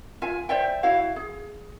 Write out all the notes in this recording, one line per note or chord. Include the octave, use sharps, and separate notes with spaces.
F4 E5 G#5
C5 D5 E5 G5
E4 F#4 F5
G#4